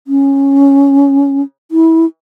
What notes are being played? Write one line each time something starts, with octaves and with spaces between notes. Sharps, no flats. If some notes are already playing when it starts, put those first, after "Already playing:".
C#4
E4